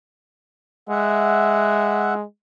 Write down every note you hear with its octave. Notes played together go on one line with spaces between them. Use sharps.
G#3 E5 F#5